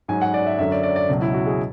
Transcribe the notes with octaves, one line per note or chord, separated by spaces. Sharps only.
G#2 F#3 G#5
F#5
D5
E5
F#2 D3 F#3 E5
D5
D5
D5
C#2 B2 F#3
E4
F#4
G#4